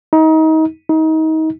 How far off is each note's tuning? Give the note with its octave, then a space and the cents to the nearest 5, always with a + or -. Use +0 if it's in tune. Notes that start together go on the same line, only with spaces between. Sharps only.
D#4 +30
D#4 +30